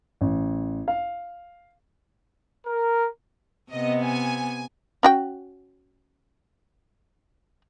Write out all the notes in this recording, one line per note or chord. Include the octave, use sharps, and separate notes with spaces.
A1
F5
A#4
C3 B3 D#5
G#5
C#4 F#4 G5